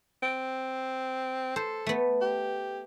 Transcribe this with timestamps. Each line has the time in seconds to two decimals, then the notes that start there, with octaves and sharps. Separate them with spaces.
0.22 C4
1.56 A4 C5
1.86 A3 B3
2.21 G4